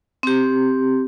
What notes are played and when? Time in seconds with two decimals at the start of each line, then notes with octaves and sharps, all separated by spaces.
0.23 C4 G4